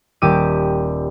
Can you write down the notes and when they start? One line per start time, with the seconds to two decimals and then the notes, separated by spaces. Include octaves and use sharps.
0.22 D#1 G4 D6 E6 D#7